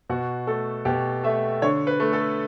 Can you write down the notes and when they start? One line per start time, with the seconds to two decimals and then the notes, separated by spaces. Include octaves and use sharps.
0.09 B2 F#4
0.47 A3 A4
0.85 B2 G4
1.23 A3 E5
1.62 D3 C#5
1.87 B4
2.00 A3
2.13 A4